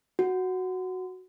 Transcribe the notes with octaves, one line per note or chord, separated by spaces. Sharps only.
F#4